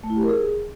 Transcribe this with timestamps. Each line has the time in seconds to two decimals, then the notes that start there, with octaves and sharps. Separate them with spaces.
0.04 A3
0.10 E4
0.16 G4
0.23 A#4
0.29 G#4